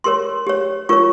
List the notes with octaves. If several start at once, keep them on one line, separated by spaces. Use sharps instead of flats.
G4 A#4 C#5 C6
G4 C#5
F4 A#4 C#5 C#6